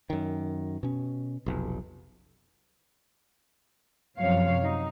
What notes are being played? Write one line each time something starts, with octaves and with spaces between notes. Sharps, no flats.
F#2 D#3
B2 C#4
F1 B1
F#2 C3 F3 C#5 F5
F#3 D#4